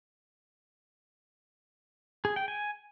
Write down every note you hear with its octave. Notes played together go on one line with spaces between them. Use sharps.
G#4
G5
G#5